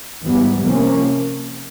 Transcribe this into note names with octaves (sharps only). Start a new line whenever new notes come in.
G#2 E3 G3 B3
C3 F3 A#3 C#4